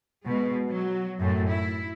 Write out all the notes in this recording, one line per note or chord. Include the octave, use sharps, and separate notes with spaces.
B2 G#3
F#3
F#2 A2 A3
E4